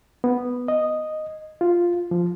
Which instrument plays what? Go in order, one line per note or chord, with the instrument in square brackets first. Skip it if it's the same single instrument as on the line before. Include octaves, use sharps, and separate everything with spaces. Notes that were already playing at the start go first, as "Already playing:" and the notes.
[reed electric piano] B3
D#5
F4
F3